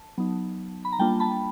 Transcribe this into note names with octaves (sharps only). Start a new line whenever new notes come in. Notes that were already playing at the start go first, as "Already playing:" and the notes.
Already playing: A5
F#3 B3 D#4
B5
A#5
G3 A#3 D4 F4 G5 A5
A5 B5